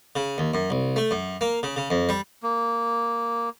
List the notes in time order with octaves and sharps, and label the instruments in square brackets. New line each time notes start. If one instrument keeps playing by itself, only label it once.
[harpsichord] C#3
D#2
F#2
C2
A3
F#2
A#3
C#3
C#3
F2
G3
[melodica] A#3